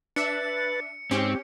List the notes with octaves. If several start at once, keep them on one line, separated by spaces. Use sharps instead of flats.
D4 B4 E5 F#6 A6 C#7
G#2 G#3 C4 C#4 D#4 G4